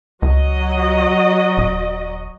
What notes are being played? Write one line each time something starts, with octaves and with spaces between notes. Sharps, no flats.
C#2 F#3 D#5
D#1